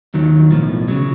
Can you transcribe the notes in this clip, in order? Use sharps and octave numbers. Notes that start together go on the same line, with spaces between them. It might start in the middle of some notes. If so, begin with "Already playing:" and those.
D#2 D#3 F#3
B1 A2 F3
C#3 F#3